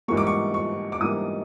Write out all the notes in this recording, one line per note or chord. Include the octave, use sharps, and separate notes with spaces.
G#2 E3 G3 A#3 C#6
D6
C#6
C#6
D6
G#2 E3 G3 A#3 D#6